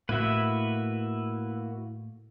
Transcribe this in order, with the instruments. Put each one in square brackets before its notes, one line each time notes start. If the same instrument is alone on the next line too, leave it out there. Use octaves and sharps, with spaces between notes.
[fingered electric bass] A2 A3 [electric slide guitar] A#3 E4 F#4 [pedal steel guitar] B4 E5